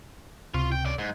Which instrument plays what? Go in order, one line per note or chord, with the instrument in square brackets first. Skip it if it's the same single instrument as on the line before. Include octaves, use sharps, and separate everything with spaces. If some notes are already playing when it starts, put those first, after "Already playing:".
[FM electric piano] C#2 C3 C#6 [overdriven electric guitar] F4
[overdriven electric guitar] G5
C#3 D5
G#2